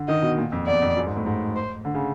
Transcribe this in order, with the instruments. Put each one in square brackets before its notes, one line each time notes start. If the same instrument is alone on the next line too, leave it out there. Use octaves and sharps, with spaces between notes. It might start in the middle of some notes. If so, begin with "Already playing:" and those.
Already playing: [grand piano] D3
[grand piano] D#3 [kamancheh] D#5
[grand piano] B2
A#2
F2
[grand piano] E2 [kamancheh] D5
[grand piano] F2
F#2
G#2
A2
G#2
[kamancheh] C5
[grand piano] D3
C#3